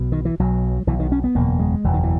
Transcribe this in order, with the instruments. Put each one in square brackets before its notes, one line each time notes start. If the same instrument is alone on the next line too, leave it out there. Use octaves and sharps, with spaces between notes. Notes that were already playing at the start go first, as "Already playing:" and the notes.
Already playing: [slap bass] B1 B2
D#3
E3
B1 B2 F#3
B1 B2 E3
D#3
C#4
B3
F#1 E2 B2 A#3
G#3
F#1 E2 B2 E3
D#3
E3